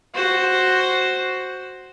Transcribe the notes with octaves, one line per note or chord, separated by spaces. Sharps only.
F#4 C5